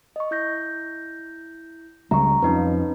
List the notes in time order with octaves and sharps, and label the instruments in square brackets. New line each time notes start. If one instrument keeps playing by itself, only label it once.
[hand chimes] D#5 C#6
E4 G6 A#6
[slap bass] C#2 F#3 G3 [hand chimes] A#5 C#6
[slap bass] F2 F3 [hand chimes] C#4 D#4 B4